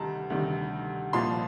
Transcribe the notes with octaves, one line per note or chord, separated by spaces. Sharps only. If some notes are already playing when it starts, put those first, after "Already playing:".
Already playing: D2 C3 D#3 G3 A5 A#5
D2 C3 D#3 G3
C2 A#2 F3 C6